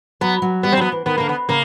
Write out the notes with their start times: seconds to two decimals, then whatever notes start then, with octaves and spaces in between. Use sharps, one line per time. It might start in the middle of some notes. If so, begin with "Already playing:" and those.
0.21 F#3 B3
0.42 F#3
0.63 G3 B3
0.72 C4
0.77 F#3 B3
0.92 E3
1.06 D#3 B3
1.18 D3 A#3
1.29 B3
1.49 C#3 A#3